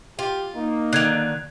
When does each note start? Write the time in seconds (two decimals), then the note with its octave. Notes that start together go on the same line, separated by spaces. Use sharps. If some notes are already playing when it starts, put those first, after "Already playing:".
0.19 F4 G4
0.55 A#3 D#4
0.93 D3 D#3 F#6 G#6 F7